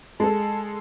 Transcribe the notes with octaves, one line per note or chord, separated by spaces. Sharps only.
G#3 A4 A5